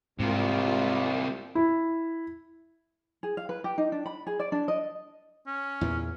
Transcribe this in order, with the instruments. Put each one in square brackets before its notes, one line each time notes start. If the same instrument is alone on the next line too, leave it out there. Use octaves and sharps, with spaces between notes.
[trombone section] C2 [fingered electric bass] G#2 [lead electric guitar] C3 A#3 [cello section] G#3 F4
[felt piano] E4
[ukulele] G#4
F5
B4
G4
D#4
D4
B5
G#4
D5
D4
D#5
[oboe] C#4
[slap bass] E2 A#2 E3